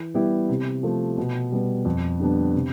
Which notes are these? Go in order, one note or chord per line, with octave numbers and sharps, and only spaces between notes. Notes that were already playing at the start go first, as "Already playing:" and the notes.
Already playing: E3
G3 B3 E4 G4
C3
F3 A3
B2
G3 B3
F2
D3 G3 B3 D4
C3